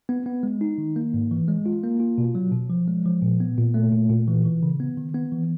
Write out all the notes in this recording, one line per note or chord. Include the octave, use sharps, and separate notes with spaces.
B3
B3
G#3
D#4
D#3
A#3
G#2
E3
G#3
F4
A#3
F4
B2
F#3
B2
F3
G#3
F3
A#2
B3
A#2
A3
A#2
A#2
E3
E3
C#3
B3
D#3
B3
E3